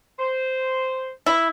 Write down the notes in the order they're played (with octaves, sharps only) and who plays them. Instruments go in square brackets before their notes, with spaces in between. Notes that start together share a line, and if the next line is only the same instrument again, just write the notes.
[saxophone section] C5
[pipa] E4